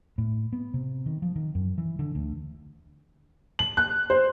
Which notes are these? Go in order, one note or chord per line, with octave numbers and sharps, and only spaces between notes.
A2
B3
C3
D#3
F3
D#3
F#2
E3
D3
D2
F#7
F#6
C5